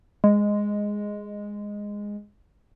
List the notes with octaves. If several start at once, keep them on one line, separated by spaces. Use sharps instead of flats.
G#3